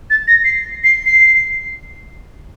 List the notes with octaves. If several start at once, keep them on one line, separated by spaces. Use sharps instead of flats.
A6
A#6
C7
C7
C7